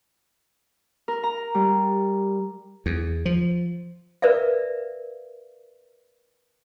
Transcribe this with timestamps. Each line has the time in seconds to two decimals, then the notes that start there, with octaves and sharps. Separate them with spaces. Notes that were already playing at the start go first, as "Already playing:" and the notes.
1.08 A#4
1.24 A#5
1.55 G3
2.86 E2
3.26 F3
4.22 A#4 B4 D5 E5 F5